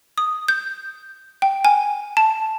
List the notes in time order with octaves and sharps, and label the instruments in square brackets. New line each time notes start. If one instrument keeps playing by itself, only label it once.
[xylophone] D#6
G6
G5
G#5
A5